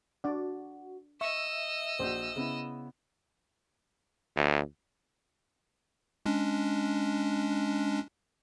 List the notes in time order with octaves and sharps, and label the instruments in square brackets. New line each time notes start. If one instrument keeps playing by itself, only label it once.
[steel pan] D4 D5 [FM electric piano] F#4
[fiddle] D#5 E6 [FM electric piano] E5 [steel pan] C#6
[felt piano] A#1 F#4 [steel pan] C5
[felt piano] C#3 B3 E4
[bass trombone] D2
[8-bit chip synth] G#3 C#4 D4